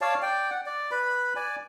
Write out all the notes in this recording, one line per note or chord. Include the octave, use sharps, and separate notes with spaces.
C#5 D5 F5 A5
D5 G5
F#5
D5
B4 B5
D5 G#5